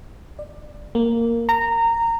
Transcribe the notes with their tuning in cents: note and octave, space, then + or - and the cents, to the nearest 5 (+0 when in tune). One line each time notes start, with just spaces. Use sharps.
D5 +20
A#3 -5
A#5 -15